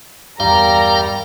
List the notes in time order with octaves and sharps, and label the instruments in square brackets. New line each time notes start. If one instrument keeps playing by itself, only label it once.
[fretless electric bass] E2 G2 [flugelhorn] G3 [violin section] A#4 A#5 [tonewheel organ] F5 G5